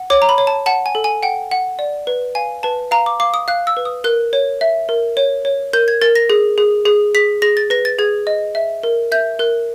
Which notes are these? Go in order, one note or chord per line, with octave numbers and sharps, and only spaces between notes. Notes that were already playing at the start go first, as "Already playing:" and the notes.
Already playing: F#5
C#5 D6
A#5
B5
C#5
A5
F#5 A5
G#5
A4
G#5
F#5 G5
F#5
D5
B4
F5 G#5
B4 A5
F5 A#5
D6
F5 D6
D#6
F5 F#6
E6
B4
D#6
A#4 F#6
C#5
E5
A#4
C#5
C#5
A#4 G6
G#6
A#4 A6
A#6
G#4
G#4
G#4
G#4 B6
G#4 A#6
A6
B4 A#6
A6
G#4 G#6
D#5
E5
A#4
E5 G6
A#4 F#6